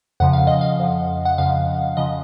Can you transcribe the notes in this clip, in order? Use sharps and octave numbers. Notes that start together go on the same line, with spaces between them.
F2 C#3 F3 F#5
F5
D#5
F5
F2 C#3 F3
F#5
F2 C#3 F3 F5
C#3 F3 D#5